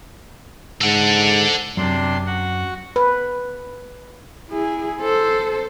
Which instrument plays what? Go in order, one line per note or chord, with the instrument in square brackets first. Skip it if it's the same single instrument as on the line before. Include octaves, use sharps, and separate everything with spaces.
[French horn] G#2 [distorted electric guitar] A4 F#5
[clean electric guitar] F#2 [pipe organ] C3 D4 C6
[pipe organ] F#4 F#5
[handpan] B4
[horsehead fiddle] E4 G#4
A4 C5